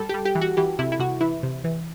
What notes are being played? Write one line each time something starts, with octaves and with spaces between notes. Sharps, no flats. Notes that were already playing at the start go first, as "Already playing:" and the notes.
Already playing: G3 A4
G4
G3
G4
E3
F#4
E3 G4
C3 E4
E4
C3 F#4
E3 E4
C3
E3